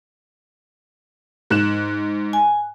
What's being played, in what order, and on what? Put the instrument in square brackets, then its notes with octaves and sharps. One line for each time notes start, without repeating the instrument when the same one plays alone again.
[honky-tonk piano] G#2 F#6 E7
[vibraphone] G#5